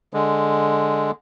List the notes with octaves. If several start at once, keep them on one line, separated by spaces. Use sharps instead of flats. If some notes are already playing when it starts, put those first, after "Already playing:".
D3 G#3